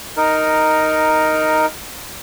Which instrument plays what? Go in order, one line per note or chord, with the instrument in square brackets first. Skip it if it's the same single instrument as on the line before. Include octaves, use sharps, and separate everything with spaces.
[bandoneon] D#4 A#4